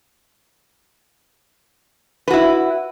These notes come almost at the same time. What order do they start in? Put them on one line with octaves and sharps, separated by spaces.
B4 F#4 E4